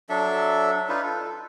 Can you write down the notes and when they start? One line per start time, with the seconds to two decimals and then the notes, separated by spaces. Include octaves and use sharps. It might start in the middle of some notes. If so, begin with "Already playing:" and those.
0.09 F#3 D4 A4 E5
0.89 D4 D#4 F4 B4
1.03 A4